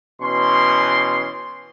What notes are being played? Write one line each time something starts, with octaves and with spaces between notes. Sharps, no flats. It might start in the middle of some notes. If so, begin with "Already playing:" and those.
B2 E3 C#4 C6